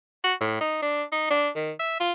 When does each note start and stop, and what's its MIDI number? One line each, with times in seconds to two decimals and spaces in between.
0.24 0.34 66
0.41 0.60 45
0.61 0.80 63
0.82 1.04 62
1.12 1.29 63
1.30 1.49 62
1.55 1.72 51
1.80 1.98 76
2.00 2.13 65